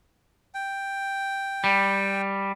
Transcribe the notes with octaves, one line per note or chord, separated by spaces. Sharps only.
G5
G3